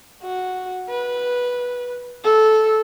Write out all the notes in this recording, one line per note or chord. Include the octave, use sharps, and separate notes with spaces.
F#4
B4
A4